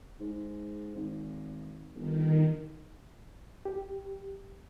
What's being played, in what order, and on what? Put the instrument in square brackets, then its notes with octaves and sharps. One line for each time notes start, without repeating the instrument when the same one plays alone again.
[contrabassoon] G#2
G#1
[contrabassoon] G1 [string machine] D#3
[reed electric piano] G4